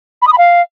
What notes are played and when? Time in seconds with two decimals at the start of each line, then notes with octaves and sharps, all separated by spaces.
0.22 B5
0.27 D#6
0.33 B5
0.38 F5